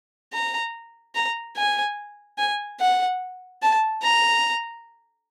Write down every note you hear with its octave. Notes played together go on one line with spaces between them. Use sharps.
A#5
A#5
G#5
G#5
F#5
A5
A#5